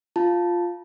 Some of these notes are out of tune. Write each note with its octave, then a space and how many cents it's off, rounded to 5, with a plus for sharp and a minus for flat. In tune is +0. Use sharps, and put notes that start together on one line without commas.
F4 +0 A5 +0